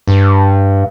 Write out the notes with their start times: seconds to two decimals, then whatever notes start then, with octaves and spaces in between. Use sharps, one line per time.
0.07 G2